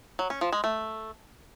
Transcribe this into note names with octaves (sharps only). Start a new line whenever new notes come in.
F#3
C#4
F3
G#3
A3